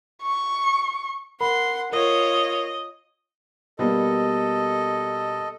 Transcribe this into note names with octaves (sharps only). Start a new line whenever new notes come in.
C#6
A#4 F#5 B5 C6
F4 A#4 C#5 D#5
B2 G3 A#3 A4 D#5